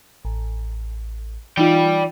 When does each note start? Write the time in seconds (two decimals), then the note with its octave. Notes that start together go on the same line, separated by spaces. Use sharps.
0.25 A1
1.57 E3 D#4 F4 D5 G5